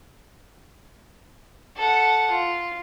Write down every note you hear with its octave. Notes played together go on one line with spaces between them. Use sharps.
A4 F#5
F4